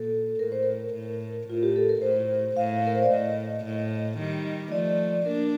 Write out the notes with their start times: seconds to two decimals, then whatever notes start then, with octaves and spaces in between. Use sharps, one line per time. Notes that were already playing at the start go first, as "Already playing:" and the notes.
Already playing: A#2 A4
0.39 A2 A#4
0.52 C5
0.63 A#4
0.94 A2
1.48 A2 F4
1.63 G4
1.76 A4
1.89 A#4
2.01 A2 C5
2.57 A2 F5
2.87 A#4
2.95 C5
3.03 D5
3.10 A2 D#5
3.65 A2
4.18 D#3 G3
4.72 F3 A3 D5
5.26 A#3 D4 A#4